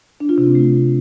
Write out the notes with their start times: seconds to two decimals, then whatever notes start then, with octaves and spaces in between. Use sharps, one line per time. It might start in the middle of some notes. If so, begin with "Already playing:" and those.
0.20 D4
0.29 F4
0.38 C3
0.46 C4
0.55 A3